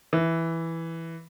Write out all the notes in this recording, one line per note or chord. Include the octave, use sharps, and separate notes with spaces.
E3